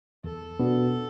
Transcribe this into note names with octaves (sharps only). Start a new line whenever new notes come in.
E2 A4
B2 B3 D4 F#4